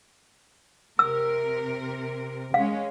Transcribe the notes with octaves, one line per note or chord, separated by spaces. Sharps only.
C3 A#4 E6
G#3 C#4 F5